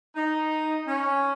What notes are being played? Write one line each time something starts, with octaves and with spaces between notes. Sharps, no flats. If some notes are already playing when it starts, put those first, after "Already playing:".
D#4
C#4